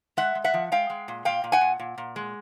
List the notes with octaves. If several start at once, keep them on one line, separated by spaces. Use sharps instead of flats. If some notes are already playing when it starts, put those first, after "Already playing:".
G#3 E5 F#5
G#3
E5 F#5
F3
G#3 F5 G5
G#3
A#2
A#2 F5 G5
A#2
F#5 G#5
A#2
A#2
A#2
G#3